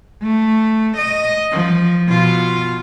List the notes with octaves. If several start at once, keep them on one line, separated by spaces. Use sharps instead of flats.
A3
D#5
F3
B2 F4